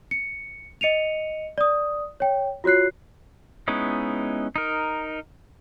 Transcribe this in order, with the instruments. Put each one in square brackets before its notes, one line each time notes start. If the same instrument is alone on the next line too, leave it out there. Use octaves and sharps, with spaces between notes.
[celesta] C#7
D#5 C#7 D#7 F7
D5 D#6
C#5 G5
F4 F#4 C#5 F#6 C7
[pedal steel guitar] G#3 B3 C#4 D#4 E4
D#4 A#4